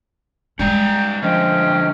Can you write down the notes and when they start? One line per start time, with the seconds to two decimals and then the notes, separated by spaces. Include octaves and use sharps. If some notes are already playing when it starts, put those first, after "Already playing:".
0.59 G3 G#3 C#4 D5 G5 A#5
1.22 D3 F3 C#4 C5 D#5 G5